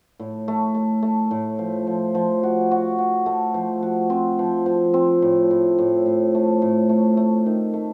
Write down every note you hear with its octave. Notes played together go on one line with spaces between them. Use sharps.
A2
A3
A3
A3
A2
F3
F3
F3
F#4
F#4
F#4
A3
F3
F#4
C4
F3
F3
C4
A2
A2
A2
A2
A3
A2
A3
A3
D#3
A3